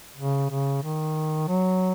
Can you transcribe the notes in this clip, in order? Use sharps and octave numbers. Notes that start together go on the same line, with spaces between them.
C#3
C#3
D#3
F#3